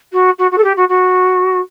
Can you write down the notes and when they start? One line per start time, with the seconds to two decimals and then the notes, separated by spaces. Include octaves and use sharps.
0.12 F#4
0.38 F#4
0.51 F#4
0.57 A4
0.64 G4
0.76 F#4
0.88 F#4